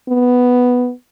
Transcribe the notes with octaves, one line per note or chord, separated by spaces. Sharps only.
B3